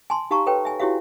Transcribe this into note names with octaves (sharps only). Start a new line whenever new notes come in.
G#5 A5 C6
D#4 G4 F5 A5 A#5 C#6
A4 B4 C#5 G5
E5 G#5
E4 F#4 G4 C#5 E5 F5